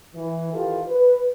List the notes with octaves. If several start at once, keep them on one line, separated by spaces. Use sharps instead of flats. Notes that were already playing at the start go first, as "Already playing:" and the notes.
E3
D#3 E3 F4 G4 A4
B4